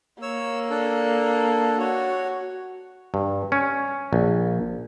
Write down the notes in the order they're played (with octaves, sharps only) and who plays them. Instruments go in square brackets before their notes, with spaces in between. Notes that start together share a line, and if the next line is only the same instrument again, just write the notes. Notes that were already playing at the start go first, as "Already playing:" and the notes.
[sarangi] A#3 [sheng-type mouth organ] C#5 E6
[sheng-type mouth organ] D4 A4
[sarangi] F#4 [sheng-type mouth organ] C#5
[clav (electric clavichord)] G2
C#4
A#1